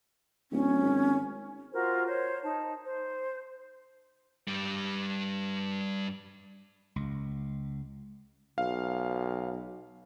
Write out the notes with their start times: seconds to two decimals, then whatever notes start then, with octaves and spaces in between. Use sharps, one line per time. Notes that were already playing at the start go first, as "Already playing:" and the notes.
0.52 D1 C#4
0.82 G#1
1.72 F4 F#4 A#4 C5
2.06 C5 C#5
2.42 D#4 A5
2.85 C5
4.48 G2 G3
6.96 C#2
8.58 B1 F5